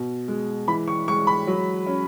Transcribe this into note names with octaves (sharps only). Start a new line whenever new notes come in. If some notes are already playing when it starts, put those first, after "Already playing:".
Already playing: B2
G#3
E3 B5
C#6
G#3 C#6
B5
F#3
C#4